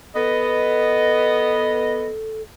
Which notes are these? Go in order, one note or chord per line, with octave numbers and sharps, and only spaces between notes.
B3 A4 D#5